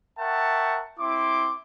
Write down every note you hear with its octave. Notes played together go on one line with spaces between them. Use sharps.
A#4 E5 F#5 G5 A5 C#6
C4 E4 C6 D6